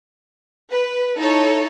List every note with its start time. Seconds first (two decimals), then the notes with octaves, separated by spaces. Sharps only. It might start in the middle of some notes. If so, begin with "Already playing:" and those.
0.72 B4
1.17 D#4 E4 A4 C#5